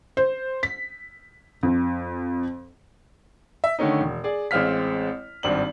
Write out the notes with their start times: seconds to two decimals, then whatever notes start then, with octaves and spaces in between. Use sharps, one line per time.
0.17 C5
0.63 B6
1.63 F2
3.64 E5
3.79 D3 D#3 A3 C#4 D#4
4.01 E1
4.24 G#4 D5
4.51 A1 G#3 C4 F5 F6 B6
5.43 G#1 G2 C4 D5 F#7